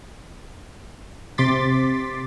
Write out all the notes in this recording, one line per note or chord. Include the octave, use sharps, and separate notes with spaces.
C3 C6 D6 A6 B6